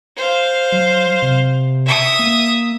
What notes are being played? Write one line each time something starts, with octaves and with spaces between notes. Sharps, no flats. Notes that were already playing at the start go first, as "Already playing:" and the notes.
C5 F5
F#3
C3
E5 D#6
A#3